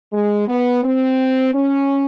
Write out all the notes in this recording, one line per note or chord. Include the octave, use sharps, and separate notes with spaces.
G#3
B3
C4
C#4